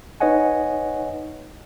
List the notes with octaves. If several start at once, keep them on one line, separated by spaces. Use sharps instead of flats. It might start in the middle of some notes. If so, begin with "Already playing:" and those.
D#4 B4 C#5 D#5 F#5 G#5